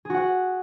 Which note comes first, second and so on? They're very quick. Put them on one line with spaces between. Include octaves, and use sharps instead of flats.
G#4 F#4 F#5